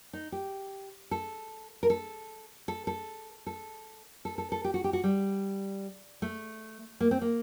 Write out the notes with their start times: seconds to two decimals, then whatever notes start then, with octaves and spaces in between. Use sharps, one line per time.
0.13 D#4
0.32 G4
1.11 A4
1.83 A#4
1.90 A4
2.68 A4
2.87 A4
3.47 A4
4.25 A4
4.38 A4
4.52 A4
4.64 G4
4.74 F#4
4.84 G4
4.93 F#4
5.04 G3
6.22 A3
7.00 A#3
7.11 C4
7.21 A#3